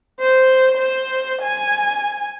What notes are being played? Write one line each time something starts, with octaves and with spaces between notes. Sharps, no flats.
C5
C5
G#5